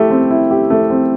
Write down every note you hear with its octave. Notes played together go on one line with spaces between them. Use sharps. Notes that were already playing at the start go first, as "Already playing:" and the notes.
Already playing: A3 E4 G4
C4
E4
G4
A3
C4